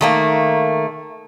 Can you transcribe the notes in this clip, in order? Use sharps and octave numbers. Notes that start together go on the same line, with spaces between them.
D#3 A3 A#3